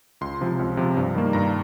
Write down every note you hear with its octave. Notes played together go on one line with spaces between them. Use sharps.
C#2 C6
C3 F3
C#2
C3 F3
G2
D#3 G3 A#3
G2 A#5